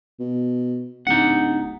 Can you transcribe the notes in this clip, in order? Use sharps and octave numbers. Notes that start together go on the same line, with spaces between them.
B2
D1 D#4 F#5